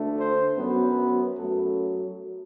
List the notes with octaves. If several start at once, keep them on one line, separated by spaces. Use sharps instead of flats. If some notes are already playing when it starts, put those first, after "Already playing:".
Already playing: D2 D3 A3
C5
F#2 F#3 B3 B4
F#2 F#3 A3 A4